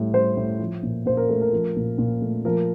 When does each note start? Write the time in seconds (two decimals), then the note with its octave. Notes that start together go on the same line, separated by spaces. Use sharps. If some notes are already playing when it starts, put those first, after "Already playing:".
Already playing: A2 G3
0.13 G3 C5
0.37 A2
0.60 F3
0.83 A#2
1.06 A#2 C5
1.17 A#4
1.29 A3 A4
1.41 A#4
1.53 F3
1.76 A#2
1.98 A#2
2.21 A3
2.45 F3 A#4